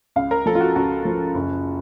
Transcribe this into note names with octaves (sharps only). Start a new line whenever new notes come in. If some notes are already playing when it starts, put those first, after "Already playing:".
C#2 F5
A#4
F3 A4
F4
F#4
C#2 F#4
F3
F#1